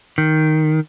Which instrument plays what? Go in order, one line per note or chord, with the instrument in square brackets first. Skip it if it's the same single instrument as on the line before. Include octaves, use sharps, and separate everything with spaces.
[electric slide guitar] D#3